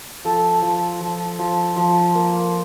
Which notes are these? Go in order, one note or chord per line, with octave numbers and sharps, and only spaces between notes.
F3 A4
F3
F3
F3
F3
A#3